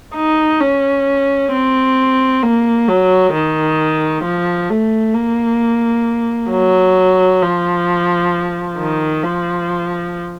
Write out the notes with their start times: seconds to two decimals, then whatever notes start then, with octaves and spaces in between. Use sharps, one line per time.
0.15 D#4
0.61 C#4
1.52 C4
2.43 A#3
2.88 F#3
3.33 D#3
4.24 F3
4.70 A3
5.15 A#3
6.50 F#3
7.42 F3
8.78 D#3
9.23 F3